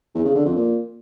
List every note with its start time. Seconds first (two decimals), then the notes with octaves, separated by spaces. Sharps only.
0.15 E2
0.25 C#3
0.35 D3
0.45 F2
0.55 A#2